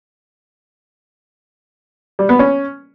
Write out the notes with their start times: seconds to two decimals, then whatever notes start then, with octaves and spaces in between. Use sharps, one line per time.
2.19 G3
2.29 B3
2.39 C#4